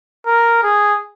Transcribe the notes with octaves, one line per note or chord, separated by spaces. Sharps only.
A#4
G#4